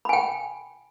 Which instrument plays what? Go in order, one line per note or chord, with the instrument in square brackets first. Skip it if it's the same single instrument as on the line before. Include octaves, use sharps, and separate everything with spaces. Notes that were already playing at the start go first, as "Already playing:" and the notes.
[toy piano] B5
G#5
G5